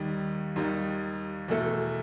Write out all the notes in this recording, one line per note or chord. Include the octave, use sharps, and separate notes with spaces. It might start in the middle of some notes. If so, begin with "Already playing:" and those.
Already playing: D#2 D#3 G3 D#4
D#2 D#3 G3 D#4
E2 B2 A3 E4 A4